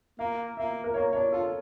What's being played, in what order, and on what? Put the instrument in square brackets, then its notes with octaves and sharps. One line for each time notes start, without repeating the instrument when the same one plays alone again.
[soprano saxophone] A#3 [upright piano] F5
[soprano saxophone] A#3 [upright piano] E5
[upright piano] A#4
[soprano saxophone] A#3 [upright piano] C#5
[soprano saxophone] D4 [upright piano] C#5
[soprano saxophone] F4 [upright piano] A4